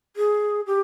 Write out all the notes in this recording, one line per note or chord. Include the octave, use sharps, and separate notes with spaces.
G#4
G4